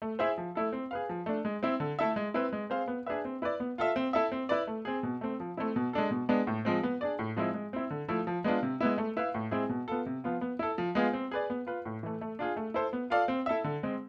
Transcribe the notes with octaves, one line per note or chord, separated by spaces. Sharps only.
A3
E4 G#4 C5 E5
F3
A3 E4 A4
C4
G#4 B4 F5
F3
A3 D4
G#3
C4 E4
D3
A3 E4 A4 E5
G#3
C4 E4 B4
G#3
C4 G#4 C5 F5
B3
D4 G#4 B4 E5
C4
E4 B4 D5
B3
F4 A4 E5
C4
E4 A4 E5
C4
E4 B4 D5
A3
C4 G#4
B2
A3 C4
F3
A3 C4 E4
B2
G#3 D4 A4
B2
G#3 B3 D4
A2
F3 G#3 C4
B3
D4 G#4 D5
A2
F3 G#3 C4 E4
G#3
C4 E4
D3
F3 A3 E4
F3
G#3 B3 D4 F4
C3
G#3 B3 E4
A3
E4 B4 F5
A2
G#3 C4 E4 G#4
B2
B3 F4 A4
C3
F3 B3 F4
B3
E4 A4
F3
G#3 B3 F4 G#4
C4
G#4 B4 D5
B3
F4 B4
A2
E3 A3
A3
D4 F4 G#4
A3
E4 A4 C5
B3
F4 A4 D5 F5
C4
E4 A4 E5
D3
G#3 C4